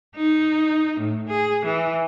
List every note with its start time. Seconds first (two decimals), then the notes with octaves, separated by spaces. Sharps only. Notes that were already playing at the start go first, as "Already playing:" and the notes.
0.16 D#4
0.99 A2
1.29 G#4
1.65 E3